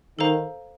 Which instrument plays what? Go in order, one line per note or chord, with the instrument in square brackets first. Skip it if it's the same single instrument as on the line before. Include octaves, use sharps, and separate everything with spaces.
[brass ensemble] D#3 [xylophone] A4 C5 F5 A#5